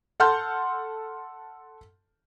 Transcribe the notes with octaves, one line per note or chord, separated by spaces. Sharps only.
A4 F#5 A5 C6 F6 G6